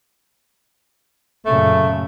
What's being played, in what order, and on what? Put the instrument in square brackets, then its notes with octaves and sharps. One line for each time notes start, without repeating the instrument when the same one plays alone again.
[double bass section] F#2 A#2 C#3 [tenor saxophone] A3